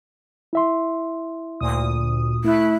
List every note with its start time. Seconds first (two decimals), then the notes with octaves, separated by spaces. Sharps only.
0.53 E4 E5 C6
1.60 D2 A#2 D#6
2.44 A3 E4 F#6